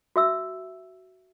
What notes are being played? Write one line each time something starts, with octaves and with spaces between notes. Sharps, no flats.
F#4 E5 E6